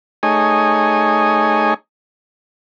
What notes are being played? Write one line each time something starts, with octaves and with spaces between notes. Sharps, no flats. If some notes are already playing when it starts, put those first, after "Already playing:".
A3 D#4 G#4 C#5 D#5 G#5